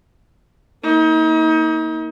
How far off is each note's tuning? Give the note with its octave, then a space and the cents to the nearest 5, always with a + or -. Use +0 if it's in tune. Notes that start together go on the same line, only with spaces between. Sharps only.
A#3 +0 D#4 +35